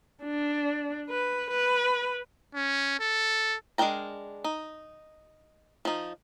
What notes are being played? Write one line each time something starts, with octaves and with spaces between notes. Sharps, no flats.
D4
B4
B4
C#4
A4
G#3 D4 A#4 G5 A#5
D#4
F3 D#4